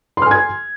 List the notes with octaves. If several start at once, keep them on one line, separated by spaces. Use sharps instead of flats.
G#5 C6 F6 G#6